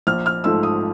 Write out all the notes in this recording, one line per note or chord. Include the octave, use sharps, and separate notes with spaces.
A#1 F6
F6
G#2 F3 A3 E6
D#6